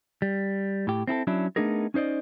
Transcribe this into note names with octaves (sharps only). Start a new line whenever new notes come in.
G3
A2 G4
C4 E4 G#4 A4
F#3 C#4 D4 E4
A3 B3 D4 D#4 G#4 A#4
C#4 D#4 C5 D5 D#5